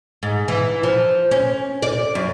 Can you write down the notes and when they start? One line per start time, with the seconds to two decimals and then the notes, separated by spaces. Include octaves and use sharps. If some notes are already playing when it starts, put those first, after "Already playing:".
0.23 G#2
0.48 E3
0.83 F3
1.31 C#4
1.82 D5
2.15 F#2